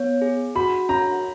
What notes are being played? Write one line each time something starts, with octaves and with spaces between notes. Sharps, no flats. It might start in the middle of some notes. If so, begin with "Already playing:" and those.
Already playing: B3 C#5
G#4
F#4 B5
C#4 A#5